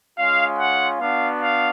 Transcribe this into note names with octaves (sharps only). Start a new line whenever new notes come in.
G#3 C#4 F4 F5
F#5
B3 D4 F#4 F5
F5